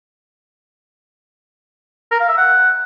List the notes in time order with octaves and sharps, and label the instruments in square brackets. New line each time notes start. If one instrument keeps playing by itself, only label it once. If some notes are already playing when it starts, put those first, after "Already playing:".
[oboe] A#4
F5
E5
F#5